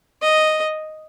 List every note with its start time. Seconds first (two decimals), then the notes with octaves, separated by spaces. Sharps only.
0.22 D#5